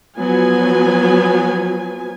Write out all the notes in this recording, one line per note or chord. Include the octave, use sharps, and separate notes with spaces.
F3 F#3 B3 G#5